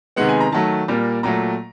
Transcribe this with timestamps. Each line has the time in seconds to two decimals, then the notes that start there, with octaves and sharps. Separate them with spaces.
0.16 C3 D#3 G#3 B3 F#5
0.29 G#5
0.41 A#5
0.52 D#3 F#3 A3 A5
0.88 A#2 G3 A#3
1.23 A#2 F#3 A3 A#5